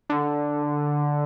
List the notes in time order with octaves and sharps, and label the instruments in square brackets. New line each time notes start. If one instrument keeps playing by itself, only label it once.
[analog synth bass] D3